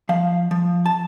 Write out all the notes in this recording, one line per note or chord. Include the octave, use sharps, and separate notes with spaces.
F3 F5
F3
A5